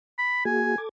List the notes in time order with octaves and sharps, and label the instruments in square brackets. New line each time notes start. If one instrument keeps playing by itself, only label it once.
[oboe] B5
[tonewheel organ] A#3 F#4 G#4 [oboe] G#5
[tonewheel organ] A4 D6 G#6